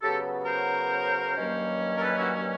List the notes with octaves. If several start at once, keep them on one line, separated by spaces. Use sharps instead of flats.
C#3 F#3 B3 G4 A4
A#4 C5
G2 D#3 F#3 A#3 C#4
A#4
A4 B4
E4 F#4